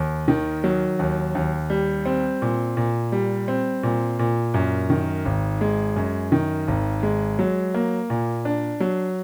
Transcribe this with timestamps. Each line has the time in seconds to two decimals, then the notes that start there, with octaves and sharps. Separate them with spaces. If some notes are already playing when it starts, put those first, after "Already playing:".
Already playing: D#2
0.28 D#3
0.64 F#3
0.99 D#2
1.35 D#2
1.70 G3
2.05 C4
2.42 A#2
2.77 A#2
3.12 G3
3.48 C4
3.83 A#2
4.19 A#2
4.54 F#2
4.90 D#3
5.25 G#1
5.61 G#3
5.96 F#2
6.32 D#3
6.68 G#1
7.03 G#3
7.39 F#3
7.74 A#3
8.10 A#2
8.45 D4
8.80 F#3